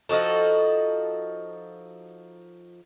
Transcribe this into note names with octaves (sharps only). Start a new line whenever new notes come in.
F3 D#4 F#4 A4